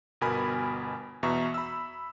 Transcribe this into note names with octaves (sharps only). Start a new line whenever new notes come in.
G1 B2 A#4 G#5 B5
E2 B2 E5 A#5 C#6
B5 E6